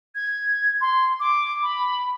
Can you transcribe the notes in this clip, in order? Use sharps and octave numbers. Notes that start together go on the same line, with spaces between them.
G#6
C6
D6
B5